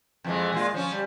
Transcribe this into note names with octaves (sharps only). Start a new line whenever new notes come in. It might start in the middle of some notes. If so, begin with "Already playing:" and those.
F2 E3 G#3
A#2 G#3 F4
F3 C#4
G3